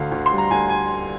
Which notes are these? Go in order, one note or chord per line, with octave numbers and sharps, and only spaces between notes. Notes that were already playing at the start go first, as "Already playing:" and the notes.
Already playing: D2 D3 F5
D2
C6
G3
A#5
D2 G#5
G#5